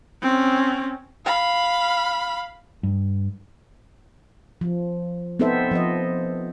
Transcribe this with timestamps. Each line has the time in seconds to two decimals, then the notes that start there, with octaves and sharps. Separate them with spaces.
0.22 C4 C#4
1.25 F5 B5
2.83 G2
4.61 F3
5.39 B3 C4 D#4 A4 C5 E5
5.71 F3 C5 D#5